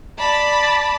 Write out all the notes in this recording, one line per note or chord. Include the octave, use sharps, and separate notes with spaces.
D5 A5 B5